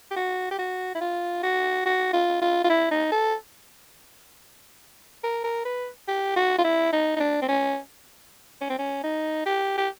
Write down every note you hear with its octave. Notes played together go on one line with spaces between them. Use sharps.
G4
F#4
G4
F#4
E4
F4
F#4
F#4
F4
F4
F4
E4
D#4
A4
A#4
A#4
B4
G4
F#4
F4
E4
D#4
D#4
D4
C4
C#4
C#4
C4
C#4
D#4
G4
G4